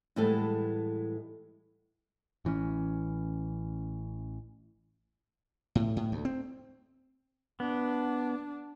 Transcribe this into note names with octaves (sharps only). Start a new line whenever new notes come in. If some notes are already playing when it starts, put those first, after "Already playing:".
A2 E3 G3 G#3 B3 A4
A1 E3 B3 C#4
A2
A2
D2
C4
B3 D4